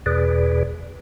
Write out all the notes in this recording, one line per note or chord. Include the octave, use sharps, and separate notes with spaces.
E2 B2 G#4 B4 D5